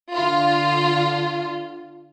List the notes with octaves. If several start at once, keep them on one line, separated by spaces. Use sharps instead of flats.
D3 F4